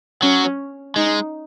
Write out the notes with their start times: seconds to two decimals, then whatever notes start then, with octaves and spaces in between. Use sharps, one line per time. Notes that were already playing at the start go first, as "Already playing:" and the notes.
0.22 F#3 C#4
0.96 G#3 D#4